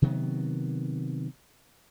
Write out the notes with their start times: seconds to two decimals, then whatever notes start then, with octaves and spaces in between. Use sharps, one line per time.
0.02 C3 D#3 F#3 B3